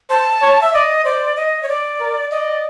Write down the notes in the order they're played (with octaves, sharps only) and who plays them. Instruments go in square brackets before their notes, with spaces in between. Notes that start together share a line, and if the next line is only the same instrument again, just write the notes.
[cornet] C5 [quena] A5
[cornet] C#5
[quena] E5
[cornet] D5 [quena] D#5
[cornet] C5 [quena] D5
[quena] D#5
C#5
D5
[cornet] A#4
[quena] D5 [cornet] D#5